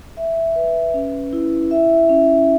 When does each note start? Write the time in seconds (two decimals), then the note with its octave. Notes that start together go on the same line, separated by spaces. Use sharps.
0.17 E5
0.56 B4
0.94 C#4
1.33 E4
1.71 E5
2.09 C#4